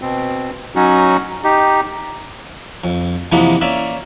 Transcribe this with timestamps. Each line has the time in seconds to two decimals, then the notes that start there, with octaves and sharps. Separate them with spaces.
0.02 B2 C4
0.76 F#3 C#4 D#4 F#4
1.44 D#4 G4
2.84 F2
3.32 C3 E3 F3 G#3 A#3 B3
3.61 A#3 C#4 D5 E5